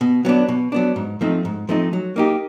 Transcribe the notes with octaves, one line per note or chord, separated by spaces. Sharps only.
B2
F#3 B3 D4
B2
F#3 B3 D4
G#2
F3 A3 C4 D#4
G#2
F3 A3 C4 D#4
F#3
A#3 D#4 G4